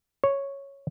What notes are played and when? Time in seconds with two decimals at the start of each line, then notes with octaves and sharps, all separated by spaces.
0.24 C#5